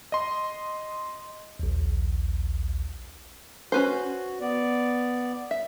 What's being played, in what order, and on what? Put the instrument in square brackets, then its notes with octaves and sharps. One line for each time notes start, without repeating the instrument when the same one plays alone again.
[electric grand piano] D#5 C6
[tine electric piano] A#1 D#2
[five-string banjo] C#4 B4 C5 [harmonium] F#4
[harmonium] B3 D5
[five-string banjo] E5